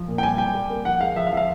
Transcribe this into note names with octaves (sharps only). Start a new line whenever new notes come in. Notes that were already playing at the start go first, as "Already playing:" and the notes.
Already playing: F3
A#2
G5
G3 G#5
G3 G5
G3
A#3
F3 F#5
G#3 F5
F3 E5
F5
F3
F5